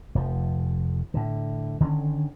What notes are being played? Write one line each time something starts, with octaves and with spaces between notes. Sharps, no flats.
F1 F3
A2 D3
D3 D#3 C4 C#4